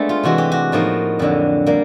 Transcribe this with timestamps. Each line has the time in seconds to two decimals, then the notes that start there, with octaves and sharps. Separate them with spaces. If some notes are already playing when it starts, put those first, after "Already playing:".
Already playing: G#3 A3 B3 D4 A4
0.09 F4
0.23 C3 E3 G#3 F#4
0.38 G4
0.52 F#4
0.72 A2 F3 A#3 D#4
1.19 F2 D3 F#3
1.66 G3 A#3